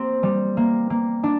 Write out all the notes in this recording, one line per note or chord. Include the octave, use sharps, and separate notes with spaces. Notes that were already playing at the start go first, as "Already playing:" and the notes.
Already playing: A#3 C4 G4
G3
A#3
A#3
D4